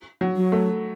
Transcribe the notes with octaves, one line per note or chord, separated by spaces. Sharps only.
F#3
F#3
A3